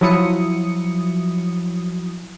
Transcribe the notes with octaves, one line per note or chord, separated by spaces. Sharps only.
F3 F#3 E4 D#6 C#7